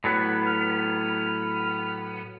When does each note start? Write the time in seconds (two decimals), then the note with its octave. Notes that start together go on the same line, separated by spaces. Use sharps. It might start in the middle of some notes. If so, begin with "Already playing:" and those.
0.04 A2 F#3 B3
0.47 F6